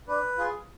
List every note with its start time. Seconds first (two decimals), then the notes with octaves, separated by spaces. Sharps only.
0.08 D4 B4
0.38 F4 G#4